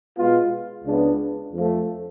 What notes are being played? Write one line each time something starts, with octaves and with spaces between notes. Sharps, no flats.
B2 G#3 B3 F4
C#2 C#3 G#3 B3 D4
F2 F3 A3